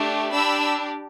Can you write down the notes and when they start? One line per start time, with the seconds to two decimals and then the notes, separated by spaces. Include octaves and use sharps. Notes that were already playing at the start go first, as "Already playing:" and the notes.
Already playing: A3 D4 G4
0.33 D4 G4 B5 E6